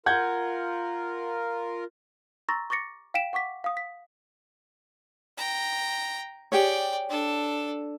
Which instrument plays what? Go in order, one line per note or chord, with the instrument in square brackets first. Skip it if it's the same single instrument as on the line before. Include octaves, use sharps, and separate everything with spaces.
[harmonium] F4 A#4 [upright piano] F#5 G6 G#6
[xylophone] A#5 C6 C#6 E6 A6 A#6
C#6 D6 A6 A#6 C#7
F5 G5 B6 D7 E7
F#5 C#6 D6 B6
F5 D#6
B6
[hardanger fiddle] G5 A#5
[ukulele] G4 G#4 C#5 [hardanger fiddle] D5 G5
[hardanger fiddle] D4 A4